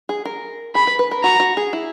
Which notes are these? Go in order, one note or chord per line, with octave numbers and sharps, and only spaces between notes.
G#4
A#4
G#4 B5
B4
B4
A#4
F#4 A#5
F#4
G#4
E4